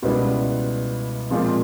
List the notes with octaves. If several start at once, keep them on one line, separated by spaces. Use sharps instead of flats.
C#2 B2 G3 B3 E4
A#2 F3 G#3 C4 F4